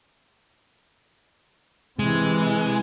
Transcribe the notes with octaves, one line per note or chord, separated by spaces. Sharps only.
C3 E3 G#3